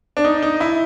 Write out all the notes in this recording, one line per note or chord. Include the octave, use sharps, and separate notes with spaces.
D4
D#4
D#4
E4